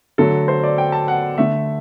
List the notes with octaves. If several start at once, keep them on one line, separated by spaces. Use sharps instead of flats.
D3 F#3 A3 A4
C5
D5
G5
A5
F#5
D3 A3 E5